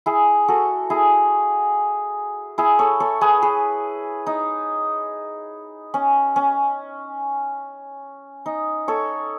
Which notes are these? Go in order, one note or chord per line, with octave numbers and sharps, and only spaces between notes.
E4 G#4
F#4 A4
E4 G#4
E4 G#4
A4 C#5
A4 C#5
G#4 B4
G#4 B4
D#4
C#4
C#4
D#4
A4 C#5